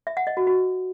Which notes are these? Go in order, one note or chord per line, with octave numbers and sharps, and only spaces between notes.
E5
F#5
D#5
F#4
F#4